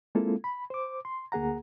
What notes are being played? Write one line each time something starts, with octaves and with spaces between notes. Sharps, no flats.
G#3 A#3 C4 E4 F4 A4
B5
C5 D6
C6
D2 A#3 G#4 F#5 A#5